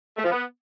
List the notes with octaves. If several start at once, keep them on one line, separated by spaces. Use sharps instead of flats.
A3
F3
B3